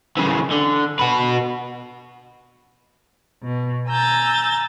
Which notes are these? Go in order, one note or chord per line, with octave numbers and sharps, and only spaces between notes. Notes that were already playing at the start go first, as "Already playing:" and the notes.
C#3 E3
D3
F#4 B4
B2
G#5 A#5 E6 G6 A6